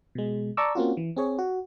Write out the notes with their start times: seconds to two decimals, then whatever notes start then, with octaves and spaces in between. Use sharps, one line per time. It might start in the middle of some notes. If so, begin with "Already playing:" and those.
0.15 B2 G#3
0.57 D5 A5 A#5 C#6 D6 E6
0.75 A#3 C4 C#4 F4 F#4
0.97 E3
1.16 C4 G#4 C#5
1.39 F#4